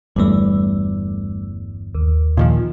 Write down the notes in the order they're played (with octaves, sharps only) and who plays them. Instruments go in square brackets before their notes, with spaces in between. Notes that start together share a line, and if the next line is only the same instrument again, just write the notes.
[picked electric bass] G1 E2 [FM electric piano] G3 A3
[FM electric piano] D#2
[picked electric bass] A#2 D#3 F3